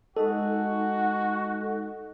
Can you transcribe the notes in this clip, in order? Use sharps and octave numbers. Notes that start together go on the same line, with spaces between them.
G#3 D#4 F#4 A4 D#5